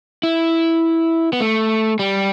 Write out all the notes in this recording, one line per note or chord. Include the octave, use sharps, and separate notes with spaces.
E4
B3
A3
G3